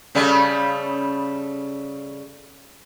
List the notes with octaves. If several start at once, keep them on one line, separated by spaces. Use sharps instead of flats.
C#3 G3 A3